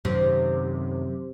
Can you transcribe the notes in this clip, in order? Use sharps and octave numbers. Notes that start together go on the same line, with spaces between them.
F#2 C3 D#3